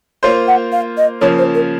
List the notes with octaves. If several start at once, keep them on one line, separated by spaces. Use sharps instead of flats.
A#3 F4 C5 C#5
F#5
F5
D#5
C#3 F3 A#3 C#5
C5
A#4